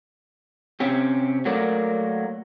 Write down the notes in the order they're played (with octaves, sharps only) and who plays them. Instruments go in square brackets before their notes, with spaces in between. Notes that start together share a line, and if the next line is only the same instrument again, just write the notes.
[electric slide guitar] C3 C4 C#4 G4
F#3 A3 A#3 A#4 D5